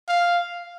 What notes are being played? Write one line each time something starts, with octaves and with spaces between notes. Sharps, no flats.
F5